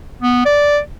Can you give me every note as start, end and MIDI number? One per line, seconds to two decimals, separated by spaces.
0.22 0.41 59
0.45 0.79 74